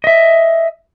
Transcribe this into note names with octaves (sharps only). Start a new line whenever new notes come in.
D#5 E5